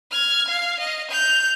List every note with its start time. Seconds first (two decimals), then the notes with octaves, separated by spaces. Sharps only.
0.11 F6 G#6
0.48 F5
0.80 D#5
1.11 G6 F7